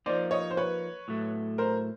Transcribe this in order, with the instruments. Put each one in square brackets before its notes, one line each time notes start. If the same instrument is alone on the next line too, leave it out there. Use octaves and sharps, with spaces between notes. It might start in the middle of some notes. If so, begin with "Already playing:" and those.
[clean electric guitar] F3 A#3 D#4 [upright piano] C5 D5
[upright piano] C#5 D#5
C5
B4 C#5
[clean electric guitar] A2 F#3 A3
[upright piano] A#4 C5